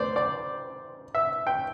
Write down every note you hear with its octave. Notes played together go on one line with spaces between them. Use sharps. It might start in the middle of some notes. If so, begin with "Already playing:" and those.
Already playing: D2 B3 C5 D5
D5
E5
G5